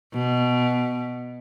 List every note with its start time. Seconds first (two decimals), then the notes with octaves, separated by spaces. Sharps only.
0.14 B2